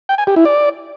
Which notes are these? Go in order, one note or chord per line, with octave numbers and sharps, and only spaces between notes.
G5
G#5
G4
E4
D5